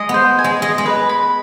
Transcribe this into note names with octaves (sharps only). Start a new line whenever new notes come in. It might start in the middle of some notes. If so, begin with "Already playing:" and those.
Already playing: G#3 D#5
B3
C5
G#5
G#3
G#3 D#5
G#3
B4
B5